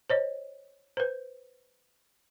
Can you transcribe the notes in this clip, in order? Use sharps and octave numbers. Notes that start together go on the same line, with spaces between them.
C5 C#5 D#5
B4 C5